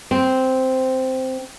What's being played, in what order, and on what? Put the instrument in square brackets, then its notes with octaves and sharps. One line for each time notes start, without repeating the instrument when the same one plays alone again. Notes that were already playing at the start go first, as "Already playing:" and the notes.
[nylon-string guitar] C4